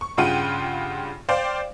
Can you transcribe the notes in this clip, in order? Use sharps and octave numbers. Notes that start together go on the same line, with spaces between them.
C#6
G2 C#3 F4 F#5 G5 D#7
C5 D5 F5 G5